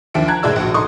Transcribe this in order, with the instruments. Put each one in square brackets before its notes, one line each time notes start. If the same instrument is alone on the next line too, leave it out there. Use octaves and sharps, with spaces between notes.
[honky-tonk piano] D#2 F3 D4 E5 D7
A5 A#5 F#6 G#6
F#1 A2 G#3 D5 E6
A#1 F#4
D#4 A4 C6 C#6 D#6